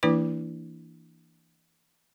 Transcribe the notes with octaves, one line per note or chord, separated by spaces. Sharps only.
E3 A#3 D4 E4 B4 D6